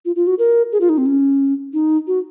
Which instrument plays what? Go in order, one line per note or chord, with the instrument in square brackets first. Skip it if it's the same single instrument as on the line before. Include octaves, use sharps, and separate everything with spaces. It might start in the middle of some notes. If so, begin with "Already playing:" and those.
[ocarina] F4
F4
F#4
A#4
G#4
F4
D#4
C4
C#4
D#4
F#4